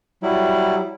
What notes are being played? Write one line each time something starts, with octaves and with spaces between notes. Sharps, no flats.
F#3 G3 E4